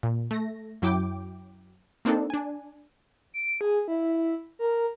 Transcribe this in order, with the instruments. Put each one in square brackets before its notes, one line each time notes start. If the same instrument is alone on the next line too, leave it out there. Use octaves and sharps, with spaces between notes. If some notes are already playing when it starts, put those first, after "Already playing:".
[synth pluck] A#2
A3 A#6
F#2 F#3 E4 G5 D6
A#3 C4 D4 D#4 A4
D4 G#5
[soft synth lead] D7
G#4
E4
A#4